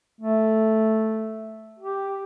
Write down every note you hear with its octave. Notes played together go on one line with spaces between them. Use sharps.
A3
G4